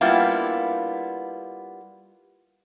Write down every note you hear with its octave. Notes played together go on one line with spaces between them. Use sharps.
G3 A#3 B3 D4 E4 F4